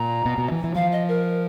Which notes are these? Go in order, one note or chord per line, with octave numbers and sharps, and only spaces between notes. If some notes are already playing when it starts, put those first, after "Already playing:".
Already playing: A#2 A#5
B2
B2
E3
E3
F3 F5
D#5
A#4